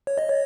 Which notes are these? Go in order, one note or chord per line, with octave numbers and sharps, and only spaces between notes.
C#5
D#5
C#5